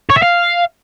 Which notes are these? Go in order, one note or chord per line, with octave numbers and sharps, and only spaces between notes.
C#5
E5
F5